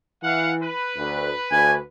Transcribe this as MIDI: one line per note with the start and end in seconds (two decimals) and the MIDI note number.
0.23 0.67 52
0.23 0.52 77
0.23 0.52 78
0.62 1.88 71
0.96 1.32 38
1.52 1.78 38
1.52 1.74 80